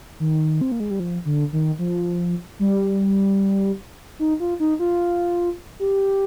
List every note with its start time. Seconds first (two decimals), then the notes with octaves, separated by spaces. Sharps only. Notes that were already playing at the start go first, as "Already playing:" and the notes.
0.20 D#3
0.61 C4
0.72 A#3
0.80 G#3
0.90 G3
1.00 F3
1.25 D3
1.53 D#3
1.79 F3
2.59 G3
4.19 D#4
4.40 F4
4.60 D#4
4.79 F4
5.80 G4